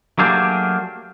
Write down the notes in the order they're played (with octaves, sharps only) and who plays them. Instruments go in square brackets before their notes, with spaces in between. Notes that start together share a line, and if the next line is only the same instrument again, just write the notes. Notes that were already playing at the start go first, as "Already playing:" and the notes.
[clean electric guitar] F#3 A3 A#3 D4 G4 G#4